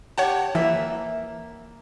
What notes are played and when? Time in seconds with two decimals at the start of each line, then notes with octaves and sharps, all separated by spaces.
0.18 G4 C#5 F#5 A5
0.55 E3 A#3 E5